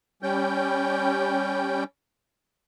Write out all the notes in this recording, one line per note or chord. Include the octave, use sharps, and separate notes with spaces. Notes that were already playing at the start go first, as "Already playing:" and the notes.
G3 C#4 G5